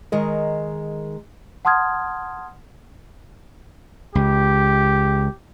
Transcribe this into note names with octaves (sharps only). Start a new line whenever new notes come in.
D#3 G#3 A#4 D#5
F#5 A5 C6 D#6 F6 G#6
C#2 G4